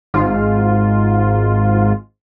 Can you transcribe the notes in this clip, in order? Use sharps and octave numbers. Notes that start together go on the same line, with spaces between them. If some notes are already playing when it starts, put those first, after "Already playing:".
G#1 G#2 F4